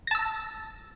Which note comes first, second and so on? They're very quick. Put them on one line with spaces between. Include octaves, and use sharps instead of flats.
A#6 A5 E6